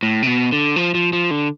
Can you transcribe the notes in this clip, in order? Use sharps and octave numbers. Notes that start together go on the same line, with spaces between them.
A2
C3
B2
D3
F3
F3
F3
D3